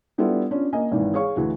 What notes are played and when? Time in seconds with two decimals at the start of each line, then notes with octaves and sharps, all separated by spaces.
0.18 G3 B3 D4 E4 F4 A4
0.51 C#4 D4 F4
0.73 A#3 D#5 G#5
0.92 G#1 D#3 E3
1.13 G#4 C#5 F5 C#6
1.36 D2 E3 F#4